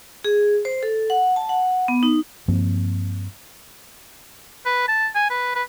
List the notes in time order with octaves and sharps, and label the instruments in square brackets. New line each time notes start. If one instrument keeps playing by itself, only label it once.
[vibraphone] G#4
C5
A4
F#5
A5
F#5
B3
D#4
[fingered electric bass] G2 F3 A#3 C4
[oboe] B4
A5
G#5
B4
B4